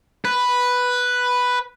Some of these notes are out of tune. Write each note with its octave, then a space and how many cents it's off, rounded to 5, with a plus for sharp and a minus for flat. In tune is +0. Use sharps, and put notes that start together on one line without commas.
B4 +0